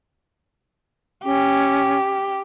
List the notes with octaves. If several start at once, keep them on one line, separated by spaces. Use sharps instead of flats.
C#4 G4